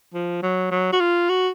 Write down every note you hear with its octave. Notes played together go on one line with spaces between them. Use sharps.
F3
F#3
F#3
F#4
F4
F#4